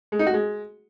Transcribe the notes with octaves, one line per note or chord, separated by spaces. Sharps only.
G#3
D#4
F#4
G#3